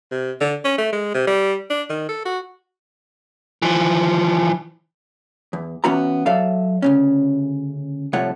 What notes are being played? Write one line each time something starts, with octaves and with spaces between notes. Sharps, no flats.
C3
D3
C#4
A3
G#3
C3
G3
D4
D#3
A4
F#4
E3 F3
E2
E3 B3 C#4 F#4 B4 A#5
F#3 A4 D5 E5 F5
D2 C#3 C#4
C2 A2 F3 A3 C#5 F#5